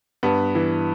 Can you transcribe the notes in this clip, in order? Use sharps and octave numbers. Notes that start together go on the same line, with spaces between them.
G2 B3
E3